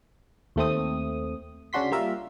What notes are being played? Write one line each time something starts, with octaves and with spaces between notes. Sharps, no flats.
D#2 A3 C4 D#6
C#3 C#4 D4 F#4 C6 B6
G3 A#3 F4 A#4 E5